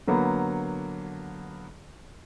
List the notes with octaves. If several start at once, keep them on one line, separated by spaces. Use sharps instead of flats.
D3 F#3 A#3 B3